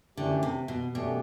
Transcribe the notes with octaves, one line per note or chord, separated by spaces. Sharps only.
F#2 D3 E3 A3 D4 G4
C3
B2
F#2 B2 E3 A3 D4 G4